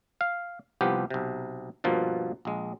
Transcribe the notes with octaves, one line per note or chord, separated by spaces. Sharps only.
F5
C2 F3 B3 G4
B1 C3
G2 B2 F3 A#3
A#1 G#3